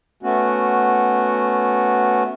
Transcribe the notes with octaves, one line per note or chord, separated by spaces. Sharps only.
A3 B3 C#4 F#4